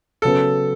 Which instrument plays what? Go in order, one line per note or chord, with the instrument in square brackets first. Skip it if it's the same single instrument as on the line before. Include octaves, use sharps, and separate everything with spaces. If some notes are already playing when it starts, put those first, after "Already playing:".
[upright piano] C#3 F#3 B3 [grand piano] A4